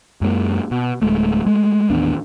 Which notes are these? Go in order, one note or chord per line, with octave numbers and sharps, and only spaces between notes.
F#2 G#3 A#3
B2
D1 G#3 A3
G#3 A3
A1 D#2 B3 D4